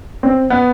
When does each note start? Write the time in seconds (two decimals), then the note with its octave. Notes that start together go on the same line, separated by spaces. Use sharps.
0.23 C4
0.50 B3